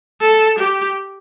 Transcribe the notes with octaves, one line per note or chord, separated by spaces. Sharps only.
A4
G4